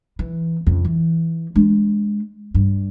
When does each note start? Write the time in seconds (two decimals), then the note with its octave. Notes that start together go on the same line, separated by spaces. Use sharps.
0.19 E3
0.67 F2 C#3
0.85 E3
1.55 G#3 D4
2.54 G2